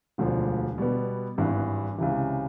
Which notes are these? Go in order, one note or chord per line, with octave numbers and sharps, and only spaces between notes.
E1 D2 D3 F3
B2 G3 B3
G#1 G2 E3
C#2 C3 E3